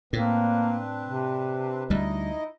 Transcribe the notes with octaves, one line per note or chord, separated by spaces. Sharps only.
A2 A#3 C4 D4 B4
C3
D2 G3 D#4 E4 D#5